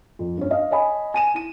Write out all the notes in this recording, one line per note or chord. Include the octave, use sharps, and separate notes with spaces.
F2
G2 C#4
D#5 F5
C#5 D#5 G#5 B5
G#5 D#7 E7
E4 D#7